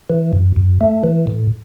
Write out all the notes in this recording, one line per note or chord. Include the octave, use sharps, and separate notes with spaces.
E3
F#2
F#2
A3
E3
A2